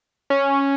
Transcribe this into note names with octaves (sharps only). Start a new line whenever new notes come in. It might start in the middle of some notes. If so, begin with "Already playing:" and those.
C#4